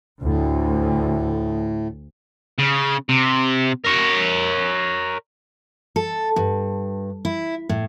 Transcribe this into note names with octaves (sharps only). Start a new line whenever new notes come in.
D2 A2
C#3
C3
A#4 C#5
A4
G2
E4
A2